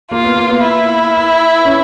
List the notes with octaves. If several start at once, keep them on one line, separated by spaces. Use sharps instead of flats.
A#3 F4
B3
A#3
B3
E4
C#4